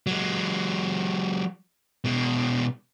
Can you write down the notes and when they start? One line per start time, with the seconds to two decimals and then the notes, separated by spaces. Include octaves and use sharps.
0.07 F#3 G#3
2.05 B2 G#3